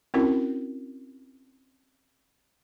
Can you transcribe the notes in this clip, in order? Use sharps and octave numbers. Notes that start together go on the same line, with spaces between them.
C4 C#4 E4 F#4 A#4